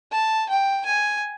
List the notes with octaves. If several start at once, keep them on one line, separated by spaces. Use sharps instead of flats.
A5
G5
G#5